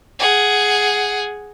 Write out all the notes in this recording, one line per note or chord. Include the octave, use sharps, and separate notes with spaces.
G#4 F#5